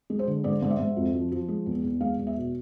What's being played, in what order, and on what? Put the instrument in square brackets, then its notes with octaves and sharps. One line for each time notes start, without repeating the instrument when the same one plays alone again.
[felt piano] G#3
C5
D3
G#2 D5
G#2 D5
E5
G#2
F2
F3
F3
G#3
E2
E2
G#3 F5
E2
E5
B2